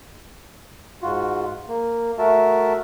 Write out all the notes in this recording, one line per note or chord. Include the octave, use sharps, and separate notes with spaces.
G#2 F4 F#4
A#3
A3 F#4 A#4 E5 A5